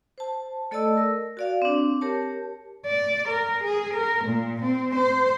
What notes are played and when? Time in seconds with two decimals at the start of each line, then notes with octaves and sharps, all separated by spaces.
0.18 C5 A5
0.71 A3 A4 D5 D#5 A5 E6
0.97 A#4
1.37 F#4 D5 F5
1.62 C4 D4
2.01 G4 A#4 C#5 A5
2.86 D5
3.28 A#4
3.64 G#4
3.94 A#4
4.25 A#2
4.62 C4
4.95 C5